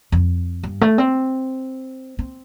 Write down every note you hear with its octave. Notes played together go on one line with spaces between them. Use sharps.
F2
G2
A3
C4
C4